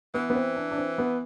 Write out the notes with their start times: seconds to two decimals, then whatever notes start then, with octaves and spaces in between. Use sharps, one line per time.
0.14 E3 B3
0.30 B3
0.35 C4
0.56 D4
0.71 D4
0.78 C4
0.98 B3